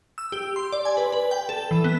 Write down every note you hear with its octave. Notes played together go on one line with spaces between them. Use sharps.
E6
G4
C6
D5
G#5
B4
B4
G5
A4
E3
B3